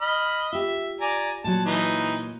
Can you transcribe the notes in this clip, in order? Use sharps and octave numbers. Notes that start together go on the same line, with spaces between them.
D#5 B5 F6
F4 G4 E5
D5 G#5 A#5
A#2 F#3 A5
E3 D#4 A#5